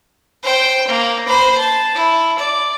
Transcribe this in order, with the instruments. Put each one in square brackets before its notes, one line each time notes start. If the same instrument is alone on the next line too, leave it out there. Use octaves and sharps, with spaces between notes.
[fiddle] C5 G5
A#3
C5 B5
A5
E4
D5